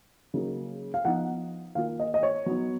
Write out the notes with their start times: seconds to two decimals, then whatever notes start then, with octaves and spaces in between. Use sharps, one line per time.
0.34 C#3 F#3 A#3 D#4
0.94 F5
1.05 F3 B3 D#4 F#5
1.75 D#3 A#3 F4 F5
2.00 D#5
2.14 D#5
2.23 C#5
2.46 F#3 B3 D#4